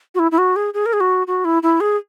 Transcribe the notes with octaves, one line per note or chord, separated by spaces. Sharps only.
F#4
E4
E4
F#4
G#4
G#4
A#4
G#4
F#4
F#4
E4
E4
G#4